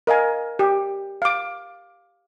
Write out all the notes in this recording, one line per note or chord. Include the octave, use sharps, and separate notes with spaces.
A#4 D#5 F5 G#5
G4
F5 D6